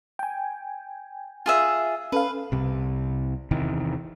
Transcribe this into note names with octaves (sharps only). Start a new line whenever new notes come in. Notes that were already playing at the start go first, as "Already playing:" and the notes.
G5 G#5
F4 G#4 E5
C#4 A4 B4 F5
C2 C3
E2 C3 D#3 E3